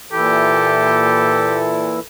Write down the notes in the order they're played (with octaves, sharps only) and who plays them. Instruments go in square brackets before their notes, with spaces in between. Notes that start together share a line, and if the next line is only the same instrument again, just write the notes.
[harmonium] A#2 E3 E4 [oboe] G4 [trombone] A4